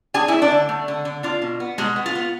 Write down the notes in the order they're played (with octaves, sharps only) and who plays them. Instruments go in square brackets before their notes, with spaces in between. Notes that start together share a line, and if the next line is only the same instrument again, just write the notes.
[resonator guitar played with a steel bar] D4 G#4 G#5
A3 E4 E5
D4 D5
D3
A3
D3
D3
D4 F4
B2
B3
B2 G#3 G#4
B3
F4
B3